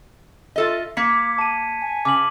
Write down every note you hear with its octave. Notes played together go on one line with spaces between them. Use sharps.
F4 A4 D#5 E5
A#3 D6 G#6 B6 C#7
A5 D#7
G#5
C#3 D6 F#7